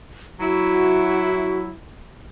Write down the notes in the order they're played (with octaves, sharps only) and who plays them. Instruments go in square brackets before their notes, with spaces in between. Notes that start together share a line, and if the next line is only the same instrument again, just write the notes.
[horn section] F#3 E4 [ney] F#4